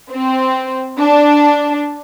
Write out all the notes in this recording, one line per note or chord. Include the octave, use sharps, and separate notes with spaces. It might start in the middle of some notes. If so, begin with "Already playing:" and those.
C4
D4